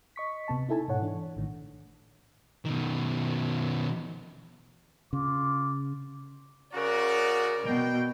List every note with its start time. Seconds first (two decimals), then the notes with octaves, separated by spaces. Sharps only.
0.16 D#5 C#6 B6
0.48 C3 B3 A5
0.69 D#4 E4 A4 G#5 A5
0.88 G#2 B2 C#5 F#5
1.02 E3 D4
1.36 A1 A2 D#3
2.66 B2 D#3
5.13 C#3 F4 D6
6.75 C#3 F#4 A#4 D5
7.66 B2 G5